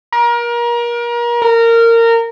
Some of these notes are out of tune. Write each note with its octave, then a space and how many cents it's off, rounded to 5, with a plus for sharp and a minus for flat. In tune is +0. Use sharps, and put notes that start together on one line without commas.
A#4 +30
A#4 -20